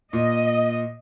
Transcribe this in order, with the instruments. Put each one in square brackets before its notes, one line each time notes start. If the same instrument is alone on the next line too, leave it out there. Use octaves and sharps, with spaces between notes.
[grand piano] A#2 [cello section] D#5